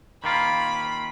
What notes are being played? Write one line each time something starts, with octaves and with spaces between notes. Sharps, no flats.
D#3 A#3 F4 B5